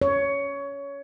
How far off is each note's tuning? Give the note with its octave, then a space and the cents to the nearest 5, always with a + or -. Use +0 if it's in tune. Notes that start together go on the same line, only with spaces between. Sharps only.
C#5 +15